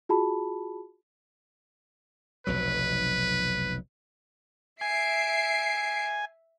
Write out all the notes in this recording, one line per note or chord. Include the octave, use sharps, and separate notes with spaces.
F4 F#4 G#4 A5 B5
F1 B1 F#3 B4
E5 G#5 C7 D7